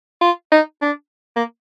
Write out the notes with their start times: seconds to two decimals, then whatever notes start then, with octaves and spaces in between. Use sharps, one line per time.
0.21 F4
0.52 D#4
0.82 D4
1.36 A#3